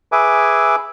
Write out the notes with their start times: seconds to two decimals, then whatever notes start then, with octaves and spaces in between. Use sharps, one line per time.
0.12 G#4 B4 E5 G#5 D6